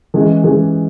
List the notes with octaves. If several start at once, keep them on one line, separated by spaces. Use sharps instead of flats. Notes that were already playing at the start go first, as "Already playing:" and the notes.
E3 G#3 C#4 G#4
E3 G#3 C#4 G#4